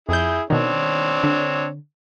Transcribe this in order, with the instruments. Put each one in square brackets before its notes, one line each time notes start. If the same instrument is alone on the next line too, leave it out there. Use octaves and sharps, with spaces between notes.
[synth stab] F2 G6 [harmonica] E4 G#4
[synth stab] B2 D#3 [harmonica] C4 D4 C#5
[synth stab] D3